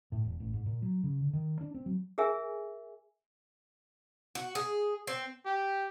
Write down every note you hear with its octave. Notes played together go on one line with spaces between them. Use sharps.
A2
E1
A1
G#2
A#2
F#3
C#3
D3
D#3
D4
C4
F#3
G#4 A#4 E5 G#5
F#4
G#4
C4
G4